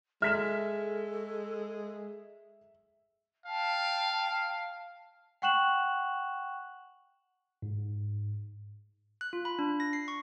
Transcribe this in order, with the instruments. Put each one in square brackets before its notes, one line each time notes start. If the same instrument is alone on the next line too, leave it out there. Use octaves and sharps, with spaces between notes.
[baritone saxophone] G#3 [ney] A4 [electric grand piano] E5 [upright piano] F6 B6 E7
[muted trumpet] F5 [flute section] G5 A5
[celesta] F#5 G5 C#6 F#6 E7 F#7
[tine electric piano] G#2
[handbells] F#6
F4
B5
D4
A#6
C7
C#6